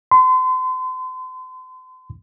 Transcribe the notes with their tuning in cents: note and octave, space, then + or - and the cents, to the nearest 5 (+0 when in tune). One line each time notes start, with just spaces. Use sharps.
C6 -35